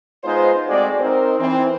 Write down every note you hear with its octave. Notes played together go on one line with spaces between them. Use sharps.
G#3 B3 D#4 F4 C5
G#3 A3 C4 F#4 D5
C4 D#4 A#4 C5
E3 C4